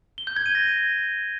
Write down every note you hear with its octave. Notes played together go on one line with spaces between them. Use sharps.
G7
G6
G#6
D#7
A#6